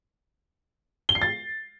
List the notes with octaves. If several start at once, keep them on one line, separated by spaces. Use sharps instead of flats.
G7
C7
A6